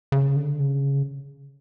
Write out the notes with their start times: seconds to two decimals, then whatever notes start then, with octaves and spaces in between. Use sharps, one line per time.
0.12 C#3
0.36 D3
0.60 C#3